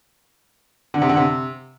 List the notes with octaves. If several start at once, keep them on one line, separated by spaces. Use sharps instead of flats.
D3
C3
D3
C3